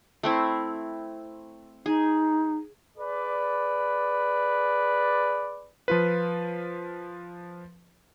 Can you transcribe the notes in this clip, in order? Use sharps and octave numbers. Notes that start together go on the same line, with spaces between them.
A3 C4 E4
D#4 G#4
G#4 B4 D5
F3 F4 B4